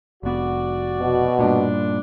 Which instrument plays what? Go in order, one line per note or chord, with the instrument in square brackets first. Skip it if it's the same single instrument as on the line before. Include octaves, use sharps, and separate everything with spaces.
[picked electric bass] F1 B3 [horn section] F#4 D5
[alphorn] B2
[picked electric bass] G2 A#2 [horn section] D4